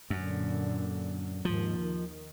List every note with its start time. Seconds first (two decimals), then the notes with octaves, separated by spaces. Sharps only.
0.10 F#2 A#2 D3
1.45 D#2 G#2 F3
1.80 D#3